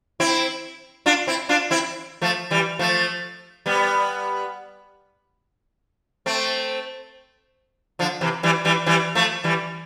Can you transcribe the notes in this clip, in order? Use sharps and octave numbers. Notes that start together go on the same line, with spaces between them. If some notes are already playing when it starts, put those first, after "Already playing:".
C4 E4
D4 F4
C4 E4
D4 F4
C4 E4
F3 A3
E3 G3
F3 A3
G3 B3
A3 C4
D3 F3
C3 E3
E3 G3
E3 G3
E3 G3
F3 A3
E3 G3